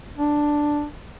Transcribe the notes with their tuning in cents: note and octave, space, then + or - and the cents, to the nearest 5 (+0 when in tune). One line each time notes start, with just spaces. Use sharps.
D4 +5